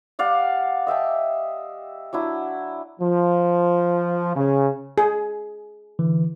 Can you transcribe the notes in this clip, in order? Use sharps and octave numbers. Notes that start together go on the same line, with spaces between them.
G3 D5 F5 F#5
D#5 E5 G5 A5
F#3 D4 E4
F3
C#3
G#4
D3 E3